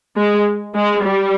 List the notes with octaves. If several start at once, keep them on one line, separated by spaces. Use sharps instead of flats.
G#3
G#3
G3